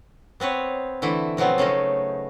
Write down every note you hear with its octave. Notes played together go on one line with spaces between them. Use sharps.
B3 C4 B4 C#5
D3 E3 A3 E4
B2 F3 F#3 B3 C4
C#3 A3 C#4 D#4